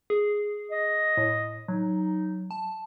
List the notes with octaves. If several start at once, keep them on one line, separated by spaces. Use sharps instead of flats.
G#4
D#5
A2
F#3 D#4
A5